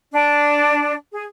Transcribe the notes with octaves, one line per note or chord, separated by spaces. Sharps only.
D4
G#4